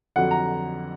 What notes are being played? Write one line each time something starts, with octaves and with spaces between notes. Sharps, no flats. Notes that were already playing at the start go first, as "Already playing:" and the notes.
F2 D3 F#3 F#5
A#5